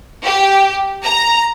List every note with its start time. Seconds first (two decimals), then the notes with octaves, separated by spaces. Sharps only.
0.25 G4
1.04 A#5